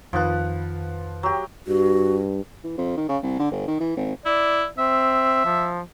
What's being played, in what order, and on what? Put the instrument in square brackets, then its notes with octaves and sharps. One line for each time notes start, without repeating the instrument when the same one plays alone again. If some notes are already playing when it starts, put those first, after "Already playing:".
[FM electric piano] F2 D#3 B4 [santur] F3 F#5
[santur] F#3 G4
[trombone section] G2 [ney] F#4
[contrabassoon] E3
F2
D#3
C#3
C2
D3
G1
D#3
E3
G#1
[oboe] E4 [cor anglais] D5
[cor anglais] C4 [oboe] E5
[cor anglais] F3